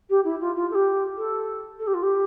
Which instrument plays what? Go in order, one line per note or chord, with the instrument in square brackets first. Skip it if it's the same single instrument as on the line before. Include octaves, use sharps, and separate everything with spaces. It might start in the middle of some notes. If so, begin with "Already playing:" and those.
[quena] G4
E4
F4
F4
A4
G4
A4
A4
G4
F4
G4